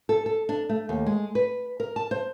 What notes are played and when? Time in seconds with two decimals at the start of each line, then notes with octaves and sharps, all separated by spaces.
0.09 A4
0.26 A4
0.49 D4
0.69 A3
0.89 D#2
1.06 G#3
1.35 B4
1.80 A#4
1.96 A5
2.11 C5